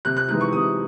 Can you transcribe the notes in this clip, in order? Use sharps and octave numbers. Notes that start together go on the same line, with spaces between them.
C3 F#6
F#6
E3 G#3 D#4 F#6
C#6
C3 D#6